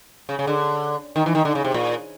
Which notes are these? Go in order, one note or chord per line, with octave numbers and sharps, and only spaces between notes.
C#3
C#3
D3
D#3
E3
D#3
D3
C#3
C3
A#2